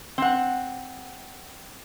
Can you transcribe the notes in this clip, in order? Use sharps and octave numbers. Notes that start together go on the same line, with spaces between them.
C4 F#5